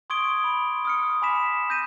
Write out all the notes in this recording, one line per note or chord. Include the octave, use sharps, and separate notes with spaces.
C6 C#6 D#6 G#6 D7 G7
B5
D#6 F6 C#7
G#5 B5 D6 B6 E7
G6 A#6 D#7